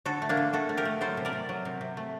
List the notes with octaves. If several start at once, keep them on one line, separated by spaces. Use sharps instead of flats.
D3 F#4 A4
A3
A#3 D4
D3
A3 F#4 A4
A3
G4 A#4
A3
F#3 A4 C5
C3
A#4 D5
C3
F#3
C3
C3
A3